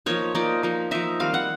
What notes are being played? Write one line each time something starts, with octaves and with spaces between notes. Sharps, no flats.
F3 A#3 D#4 C#5
F3 A#3 D#4 D5
F3 A#3 D#4
F3 A#3 D#4 E5
D#3 G3 C4 F5
F#5